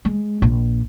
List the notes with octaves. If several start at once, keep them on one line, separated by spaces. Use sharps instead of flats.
G#3
A#1